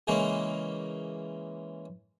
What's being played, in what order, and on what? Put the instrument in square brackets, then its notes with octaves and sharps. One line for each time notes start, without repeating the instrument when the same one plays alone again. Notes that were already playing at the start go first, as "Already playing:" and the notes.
[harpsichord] C#3 E3 G#3 A#3 C#4